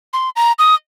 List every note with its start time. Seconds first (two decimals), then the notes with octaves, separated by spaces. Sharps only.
0.13 C6
0.36 A#5
0.59 D#6